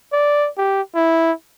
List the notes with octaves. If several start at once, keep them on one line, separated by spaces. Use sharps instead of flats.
D5
G4
E4